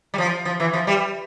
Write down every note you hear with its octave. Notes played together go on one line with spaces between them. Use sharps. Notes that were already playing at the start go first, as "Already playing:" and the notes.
G3
F3
F3
E3
F3
G3